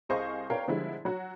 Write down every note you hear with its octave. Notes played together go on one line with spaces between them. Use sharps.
C2 G#4 C5 D#5 F5 C#6
A#4 B4 C#5 D5 F5 G5
D3 F3 G3 G#3 E4
F#3 F#4